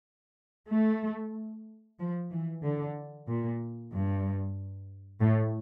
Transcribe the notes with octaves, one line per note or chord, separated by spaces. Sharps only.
A3
F3
E3
D3
A#2
G2
A2